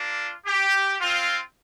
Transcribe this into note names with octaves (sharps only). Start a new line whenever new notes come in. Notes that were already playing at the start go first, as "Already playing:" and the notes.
Already playing: A#3 D4 F4
G4
C4 F4